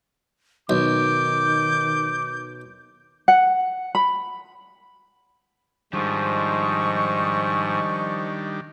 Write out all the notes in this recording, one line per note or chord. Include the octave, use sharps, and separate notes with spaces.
B1 D#3 D6 G6
F#5
B5
G#2 D#3 F3 G3 D4 D#5 C#6